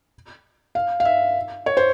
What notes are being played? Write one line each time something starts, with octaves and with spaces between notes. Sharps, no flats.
F5
F5
E5
C#5
C5